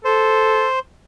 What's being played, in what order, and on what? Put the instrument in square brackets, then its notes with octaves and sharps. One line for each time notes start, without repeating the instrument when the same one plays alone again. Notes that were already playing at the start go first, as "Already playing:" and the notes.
[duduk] A4 [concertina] C5